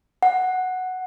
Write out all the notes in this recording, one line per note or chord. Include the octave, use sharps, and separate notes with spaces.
F#5